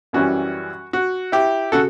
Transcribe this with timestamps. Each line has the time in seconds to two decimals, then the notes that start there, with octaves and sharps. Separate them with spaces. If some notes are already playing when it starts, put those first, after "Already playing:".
0.13 F#2 E3 G3 C#4 F#4
0.93 F#4
1.32 E4 G4
1.72 C#3 F#4 A4